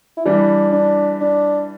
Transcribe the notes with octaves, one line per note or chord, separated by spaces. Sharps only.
E4
E3 G3 D4
D4
D4